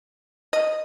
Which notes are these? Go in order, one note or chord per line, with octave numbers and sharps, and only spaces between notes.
D#5